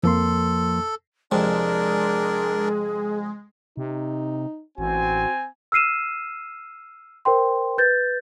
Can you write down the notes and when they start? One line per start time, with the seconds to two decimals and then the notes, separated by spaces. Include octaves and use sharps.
0.03 F2 F3 A#3 A4 C6
1.32 F2 C3 G#3 D4 G#4 A#4 D5
3.77 C3 D#4
4.78 A1 C4 F#4 G#5
5.72 E6 F6 C7 D#7 E7
7.25 A#4 C5 G5 C6
7.78 B4 G6 A6